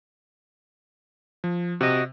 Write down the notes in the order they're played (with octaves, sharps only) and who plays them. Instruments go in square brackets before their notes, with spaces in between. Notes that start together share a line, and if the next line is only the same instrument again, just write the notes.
[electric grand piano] F3
[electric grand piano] C3 [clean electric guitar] F#4 D#5